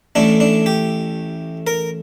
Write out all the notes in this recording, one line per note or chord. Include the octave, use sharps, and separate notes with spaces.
A1 A2 A3 D4
D4
G4
A#4